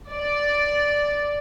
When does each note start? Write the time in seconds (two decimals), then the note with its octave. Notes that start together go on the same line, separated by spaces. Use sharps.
0.11 D5